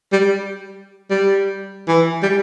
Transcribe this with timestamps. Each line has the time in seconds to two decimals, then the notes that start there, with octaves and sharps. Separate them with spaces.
0.12 G3
1.10 G3
1.88 E3
2.23 G3